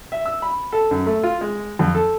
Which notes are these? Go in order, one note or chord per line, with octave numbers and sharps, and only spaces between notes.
E5
E6
B5
A4
F#2
A3
F4
G#3
F2
A4